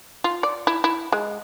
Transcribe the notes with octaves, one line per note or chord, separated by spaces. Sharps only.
F4
D5
E4
E4
G#3